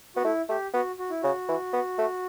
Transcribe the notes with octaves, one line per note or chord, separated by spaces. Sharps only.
B3 F#4
A3 E4
A3 G4
B3 F#4
F#4
E4
C#3 F#4
E3
B3
A3